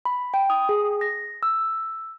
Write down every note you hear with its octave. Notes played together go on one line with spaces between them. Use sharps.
B5
G5
D#6
G#4
A#6
E6